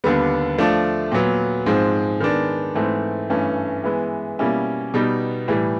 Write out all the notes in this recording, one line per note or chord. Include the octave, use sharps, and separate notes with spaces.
D#2 D3 G3 B3
F3 A3 D4 F4
A#2 F#3 B3
G#2 F3 G#3 C4
D#3 G#3 B3 D4
G#2 E3 A3 C4
G2 E3 A3 C#4
E3 G#3 B3 E4
B2 G3 A#3 C#4 E4
B2 G3 B3 D#4
A2 E3 G3